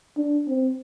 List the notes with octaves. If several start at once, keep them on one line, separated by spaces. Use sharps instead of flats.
D4
C4